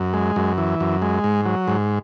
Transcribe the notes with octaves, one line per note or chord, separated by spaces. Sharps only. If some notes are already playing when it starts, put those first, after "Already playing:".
Already playing: F#2
G#3
F#2
E3
F#2
G#3
G#2
F#3
G#2